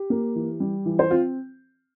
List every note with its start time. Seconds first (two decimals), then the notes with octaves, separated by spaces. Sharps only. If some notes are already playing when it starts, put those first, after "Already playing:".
Already playing: G4
0.10 A#3
0.35 E3
0.60 G3
0.86 E3
0.99 C5
1.11 C4 F4